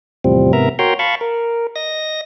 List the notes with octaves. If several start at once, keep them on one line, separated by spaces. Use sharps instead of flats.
E2 A2 C3 F3 G3 C4
G#2 C3 B3 A#4 E5 A#5
F#4 A#4 C#5 G5 A#5 C6
F5 A5 B5 C#6
A#4
D#5 A#6